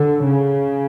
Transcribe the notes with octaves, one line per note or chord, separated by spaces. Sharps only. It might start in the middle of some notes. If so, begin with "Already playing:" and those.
Already playing: D3
C#3